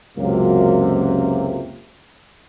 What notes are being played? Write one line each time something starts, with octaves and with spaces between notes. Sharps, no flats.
C#2 F#2 C3 A#3